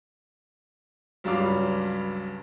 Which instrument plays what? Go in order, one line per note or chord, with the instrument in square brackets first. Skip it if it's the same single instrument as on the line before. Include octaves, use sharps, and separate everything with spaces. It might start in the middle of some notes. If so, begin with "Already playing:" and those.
[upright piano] C#2 G2 F#3 G3 F5 D6